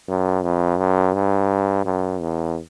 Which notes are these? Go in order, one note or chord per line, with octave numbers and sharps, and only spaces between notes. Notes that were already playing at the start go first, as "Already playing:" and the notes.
F#2
F2
F#2
G2
F#2
E2